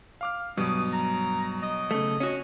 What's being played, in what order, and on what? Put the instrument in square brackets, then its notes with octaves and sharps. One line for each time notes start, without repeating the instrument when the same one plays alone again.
[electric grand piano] F5 D6 F6
[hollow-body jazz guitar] G2 [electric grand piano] B2 F#3 [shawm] D#6
[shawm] A#5
D#5
[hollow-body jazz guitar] C#3 A3
C#4 F#4